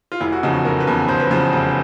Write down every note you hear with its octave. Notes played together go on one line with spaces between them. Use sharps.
F4
F1 E4
F#4
E2 C#3 F3 D#4
F#4
F1 A#4
B4
E2 C#3 F3
F1 C5
B4
E2 C#3 F3
F1